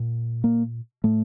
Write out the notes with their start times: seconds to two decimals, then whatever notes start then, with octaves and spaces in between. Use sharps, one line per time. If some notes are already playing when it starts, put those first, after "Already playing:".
Already playing: A#2
0.44 A#3
1.04 A2 A3